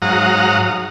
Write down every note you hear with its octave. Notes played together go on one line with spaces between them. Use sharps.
G#2 F#3 F5 F#5 A#5 D#6